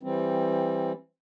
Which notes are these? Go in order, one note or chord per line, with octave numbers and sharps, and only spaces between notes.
E3 G3 C4